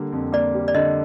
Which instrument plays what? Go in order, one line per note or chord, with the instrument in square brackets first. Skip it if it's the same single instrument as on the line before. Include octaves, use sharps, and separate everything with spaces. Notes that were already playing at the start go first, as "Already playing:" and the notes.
Already playing: [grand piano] D3 G3 A#3
F2
[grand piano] A#3 [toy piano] D5
[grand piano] G3
[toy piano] D5
[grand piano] D3 [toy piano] D#5